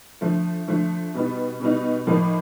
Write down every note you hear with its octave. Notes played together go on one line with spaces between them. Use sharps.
D3 F3 A3
D3 F3 A3
B2 G3 B3 D#4
B2 G3 B3 D#4
A2 F3 A#3 D#4